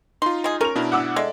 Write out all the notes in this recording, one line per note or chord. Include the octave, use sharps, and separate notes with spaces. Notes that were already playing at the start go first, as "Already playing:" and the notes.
D#4 F4 C6
G#3 G#4
C#4 A#4 F7
B2 D4 E4
F#5 D6 E6
G#3 A4 D5 E5